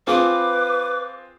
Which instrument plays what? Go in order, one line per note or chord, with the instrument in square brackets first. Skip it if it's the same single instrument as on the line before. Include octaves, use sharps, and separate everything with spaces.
[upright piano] C4 F4 G#4 [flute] B4 [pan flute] D6